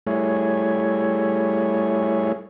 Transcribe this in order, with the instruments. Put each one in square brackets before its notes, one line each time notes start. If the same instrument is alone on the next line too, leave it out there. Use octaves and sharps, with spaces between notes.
[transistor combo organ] G3 A3 E4 G#4 C#5